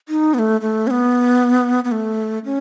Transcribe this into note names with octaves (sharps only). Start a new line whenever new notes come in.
D#4
B3
A3
A3
C#4
B3
B3
A3
C#4